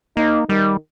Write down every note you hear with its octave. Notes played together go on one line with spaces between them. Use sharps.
A#3 D#4
D#3 G3